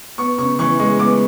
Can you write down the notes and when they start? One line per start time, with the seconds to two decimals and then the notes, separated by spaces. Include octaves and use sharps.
0.18 B3 C#6
0.38 C#3 C#6
0.59 E3 C#6
0.79 G#3 C#6
0.99 B3 D6